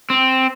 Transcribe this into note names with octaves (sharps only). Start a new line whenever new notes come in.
C4